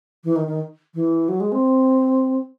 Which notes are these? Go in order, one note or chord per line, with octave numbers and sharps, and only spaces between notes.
E3
D#3
D#3
E3
F#3
G#3
C4